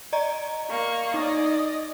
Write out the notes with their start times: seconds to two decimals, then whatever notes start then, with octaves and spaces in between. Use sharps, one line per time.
0.13 D5 D#5 A#5
0.69 A#3 C#6
1.14 D#4 D5 D#5